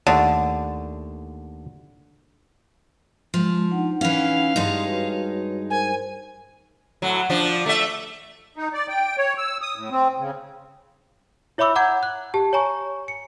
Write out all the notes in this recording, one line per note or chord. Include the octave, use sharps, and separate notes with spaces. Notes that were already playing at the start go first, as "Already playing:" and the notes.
D#2 D3 A3
F3 G#3
D4 D#4 F#5
E3 C#4 F5
G2 G#3 D#4 D5 C6 D#6
F#4 B4 C#5
A#4 C5 G#5
A2 F#3
F3 D4
A3 E5
D#4
D5
G5
C#5
E6
D#6
A2
C4
C#3
E4 C#5 E5 B5 D6 E6
F#5 A#5 D6 G6 G#6
F#6
G4 A5
C#5 G#5 A#5 C#6
C#7